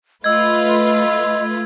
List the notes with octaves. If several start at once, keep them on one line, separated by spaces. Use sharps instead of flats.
A3 F4 B4 D#5 E6 G#6